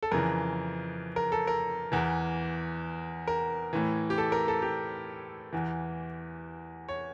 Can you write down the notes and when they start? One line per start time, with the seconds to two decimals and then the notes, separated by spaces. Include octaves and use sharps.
0.03 A4
0.11 F2 C#3 E3 A#4
1.16 A#4
1.32 A4
1.47 A#4
1.92 E2 E3
3.27 A#4
3.73 A2 E3
4.10 G4
4.18 A4
4.32 A#4
4.48 A4
4.62 G4
5.53 E2 E3
6.88 C#5